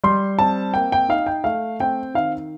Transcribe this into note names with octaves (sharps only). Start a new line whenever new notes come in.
G3 C6
C4 A5
A#3 G5
G5
D#4 F5
G5
A3 F5
C4 G5
D#3 F5